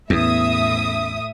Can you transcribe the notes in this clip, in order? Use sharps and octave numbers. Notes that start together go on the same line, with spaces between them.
E2 A2 B3 C#4 E5 D#6